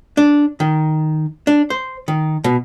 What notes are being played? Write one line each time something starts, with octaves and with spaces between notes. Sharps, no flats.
D4
D#3
D4
C5
D#3
B2